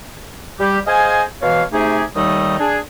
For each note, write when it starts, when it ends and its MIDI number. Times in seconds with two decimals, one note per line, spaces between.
0.59 0.79 55
0.59 0.79 67
0.87 1.23 68
0.87 1.23 72
0.87 1.23 75
0.87 1.23 77
0.87 1.23 80
1.42 1.64 47
1.42 1.64 52
1.42 1.64 73
1.42 1.64 77
1.73 2.03 48
1.73 2.03 57
1.73 2.03 63
1.73 2.03 67
1.73 2.03 68
2.15 2.56 39
2.15 2.56 51
2.15 2.56 55
2.15 2.56 57
2.15 2.56 63
2.15 2.56 87
2.59 2.78 62
2.59 2.78 68